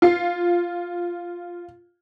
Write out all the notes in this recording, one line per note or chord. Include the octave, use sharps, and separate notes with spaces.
F4 C7